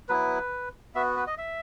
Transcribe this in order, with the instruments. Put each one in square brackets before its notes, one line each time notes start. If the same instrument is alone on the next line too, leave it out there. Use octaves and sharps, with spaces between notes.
[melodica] F#3 B3 E4 B4
B3 F#4 E5
B4
D#5
E5